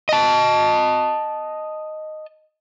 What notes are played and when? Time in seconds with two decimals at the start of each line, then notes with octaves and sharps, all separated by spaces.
0.09 D#5 A5